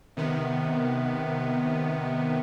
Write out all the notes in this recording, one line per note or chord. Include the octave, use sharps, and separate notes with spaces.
C3 D#3 B3